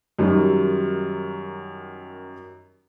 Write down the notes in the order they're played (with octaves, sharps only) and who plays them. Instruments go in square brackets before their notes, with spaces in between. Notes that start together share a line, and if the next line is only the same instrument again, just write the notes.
[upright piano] F#2 D#3 F#3 G3